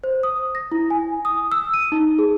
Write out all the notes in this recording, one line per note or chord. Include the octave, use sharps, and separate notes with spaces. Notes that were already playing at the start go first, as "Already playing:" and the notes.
C5
D#6
A#6
E4
G#5
D#6
E6
D#7
D#4
G#4